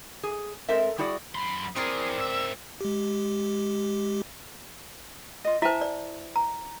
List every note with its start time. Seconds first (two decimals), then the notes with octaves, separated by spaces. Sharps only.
0.23 G#4
0.69 G#3 C4 A4 A#4 E5
0.98 G3 E4 F#4 G#4 D5
1.35 F#2 B5 C6
1.76 E3 C4 G#4 A#4 D5 D#6
2.18 G#2 E5 E6
2.81 G#3 G4
5.44 F4 D#5
5.62 E4 C5 E5 G#5 A5
5.81 D5
6.36 A#5